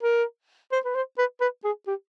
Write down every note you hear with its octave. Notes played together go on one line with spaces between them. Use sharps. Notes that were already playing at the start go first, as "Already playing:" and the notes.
A#4
C5
B4
C5
B4
B4
G#4
G4